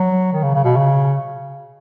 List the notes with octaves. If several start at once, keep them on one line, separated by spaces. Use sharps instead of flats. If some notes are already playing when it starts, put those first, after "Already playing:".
Already playing: F#3
D#3
C#3
C#3
B2
C#3